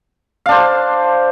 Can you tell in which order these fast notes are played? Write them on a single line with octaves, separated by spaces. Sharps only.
F5 D4 C5